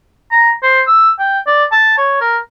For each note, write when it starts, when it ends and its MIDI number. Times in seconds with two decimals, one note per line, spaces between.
0.31 0.52 82
0.63 0.82 72
0.87 1.10 88
1.19 1.39 79
1.47 1.64 74
1.72 1.97 81
1.98 2.17 73
2.21 2.38 70